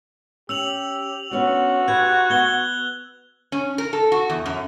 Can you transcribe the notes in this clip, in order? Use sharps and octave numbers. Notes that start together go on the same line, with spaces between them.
C#4 G4 E6 F7 F#7
B3 C#4 D4 F#4
G4 B4 F#6 G#6
B3 G#6 G7
C#4
A#4
A4
F#4
E2
F#2